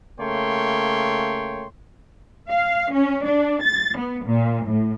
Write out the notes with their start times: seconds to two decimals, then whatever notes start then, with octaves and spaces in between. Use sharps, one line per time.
0.20 C#3 A3 A#3 C#5 G5 C6
2.50 F5
2.94 C#4
3.26 D4
3.64 A6
3.98 B3
4.27 A#2
4.66 A2